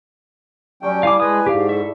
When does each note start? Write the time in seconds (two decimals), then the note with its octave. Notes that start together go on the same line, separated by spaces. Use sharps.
0.83 F#3 G3 A3 C#4 G5
1.03 G3 E4 F5 G#5 D6
1.20 G#3 B4 G#5 D#6
1.46 G#2 G4 F5
1.69 A4 E5